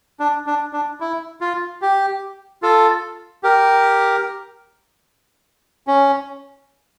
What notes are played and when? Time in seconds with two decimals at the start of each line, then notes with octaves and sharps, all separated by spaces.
0.20 D4
0.46 D4
0.73 D4
1.00 E4
1.41 F4
1.82 G4
2.62 F4 A4
3.43 G4 A#4
5.87 C#4